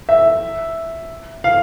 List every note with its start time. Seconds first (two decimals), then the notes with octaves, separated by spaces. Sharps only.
0.09 E5
1.44 F5